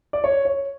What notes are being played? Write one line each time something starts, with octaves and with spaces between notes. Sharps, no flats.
D5
C#5
C#5